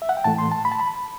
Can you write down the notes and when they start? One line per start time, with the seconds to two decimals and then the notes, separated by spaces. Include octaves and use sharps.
0.02 E5
0.09 F#5
0.17 G5
0.24 A2 E3 A3 A5
0.38 C6
0.52 A5
0.65 B5
0.72 A5
0.80 B5